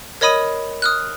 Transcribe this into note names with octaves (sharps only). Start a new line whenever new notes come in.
A#4 C#5 D#5 B5 D#6 D#7
D#6 F6 F#6